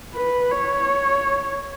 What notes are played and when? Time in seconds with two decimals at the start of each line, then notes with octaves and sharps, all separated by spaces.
0.14 B4
0.51 C#5